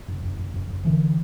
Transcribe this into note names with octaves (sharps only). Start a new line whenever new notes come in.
F#1
F#1
F#1
F#1
F#1
D3 E3